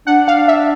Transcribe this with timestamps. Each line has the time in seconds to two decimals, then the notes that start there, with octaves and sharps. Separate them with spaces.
0.07 D4 F#5
0.28 F5
0.48 E5